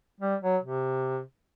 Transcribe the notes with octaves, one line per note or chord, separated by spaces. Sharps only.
G3
F#3
C3